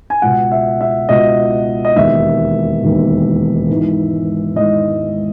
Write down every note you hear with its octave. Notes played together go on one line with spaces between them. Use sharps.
G#5
C#2 B2 F#5
E5
E5
C#2 B2 D#5
D#5
E1 D#2 D#3 E5
E1 D#2 D#3
G#1 G#2 E3
G#1 G#2 E3 D#5